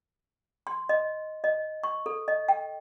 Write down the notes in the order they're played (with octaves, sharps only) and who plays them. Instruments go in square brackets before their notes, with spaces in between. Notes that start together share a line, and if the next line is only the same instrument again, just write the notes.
[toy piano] C6
D#5
D#5
C#6
A4
D#5
G5